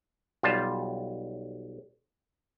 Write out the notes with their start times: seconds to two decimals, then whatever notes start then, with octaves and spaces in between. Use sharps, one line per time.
0.43 B1 G3 F4 A5